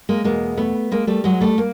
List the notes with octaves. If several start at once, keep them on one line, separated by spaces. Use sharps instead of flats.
G#3 A#3
E2 B2 G#3 A#3
A3 B3
G#3 A#3
G3 A3
F#3 G#3
G3 A3
A#3